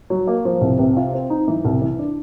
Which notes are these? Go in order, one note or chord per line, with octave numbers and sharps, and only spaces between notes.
F#3
A#3
F3
C2
C3
F4
C4
D#4
E3
C2
E3
D4